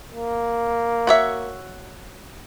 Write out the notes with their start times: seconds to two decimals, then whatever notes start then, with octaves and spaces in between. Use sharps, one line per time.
0.11 A#3
1.07 F#4 C#5 E5